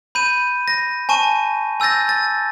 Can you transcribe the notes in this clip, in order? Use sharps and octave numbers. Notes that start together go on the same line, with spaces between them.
B5 G6 D#7
A#6
G#5 A5 C#6 D#7
G#5 E6 G6 A6 A#6
A6